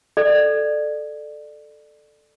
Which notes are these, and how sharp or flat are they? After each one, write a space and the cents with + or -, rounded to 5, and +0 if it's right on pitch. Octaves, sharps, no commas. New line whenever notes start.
A4 +0 D5 +25